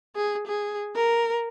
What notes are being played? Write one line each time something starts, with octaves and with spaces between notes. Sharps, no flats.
G#4
G#4
A#4